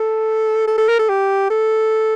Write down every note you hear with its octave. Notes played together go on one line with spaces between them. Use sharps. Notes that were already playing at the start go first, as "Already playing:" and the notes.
Already playing: A4
A4
A4
A#4
A4
G4
A4